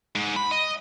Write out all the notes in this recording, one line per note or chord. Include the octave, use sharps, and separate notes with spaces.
G#2
B5
D#5